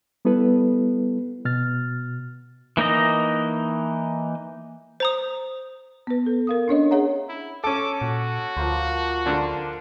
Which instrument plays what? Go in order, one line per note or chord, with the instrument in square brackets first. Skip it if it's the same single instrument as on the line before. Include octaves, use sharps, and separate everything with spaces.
[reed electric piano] G3 B3 E4 A4 B4
B2 F6 A6
[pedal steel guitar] E3 A#3 D#4 D#5
[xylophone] C5 A#5 D#6
[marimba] B3 B4
A4
A#4 F5 D#6
C#4 D4 C#5 D#5
G#4 C#5 E5 F#5 A#5
[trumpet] E4
[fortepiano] C#4 A4 [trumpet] D6
[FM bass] A#2 [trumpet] F#4
[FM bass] D2 [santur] F3 A#3 C5
[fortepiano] D3 D4 [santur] A#4 C5 F5